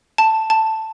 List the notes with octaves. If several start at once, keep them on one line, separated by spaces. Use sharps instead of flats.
A5
A5